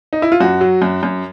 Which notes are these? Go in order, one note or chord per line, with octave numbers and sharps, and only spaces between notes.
D#4
E4
F4
F#2 F#4
F#3
F#2
F#2